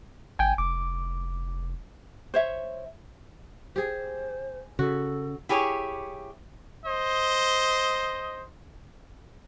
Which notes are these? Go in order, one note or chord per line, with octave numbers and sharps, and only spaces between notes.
G#1 G5 G#5
F1 D6
C5 C#5 E5
G4 G#4 C5
C#3 F#4 A4
E4 G4 G#4 C#5
C5 D#5